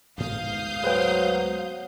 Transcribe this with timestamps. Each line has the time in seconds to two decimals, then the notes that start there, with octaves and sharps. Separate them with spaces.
0.18 D2 G#2 B3 F5 D#6 G6
0.83 F#3 B4 C5 G5